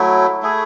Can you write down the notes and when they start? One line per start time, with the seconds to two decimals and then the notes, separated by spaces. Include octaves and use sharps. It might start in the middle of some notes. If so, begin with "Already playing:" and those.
Already playing: F#3 A3 E4
0.42 A3 E4 G#4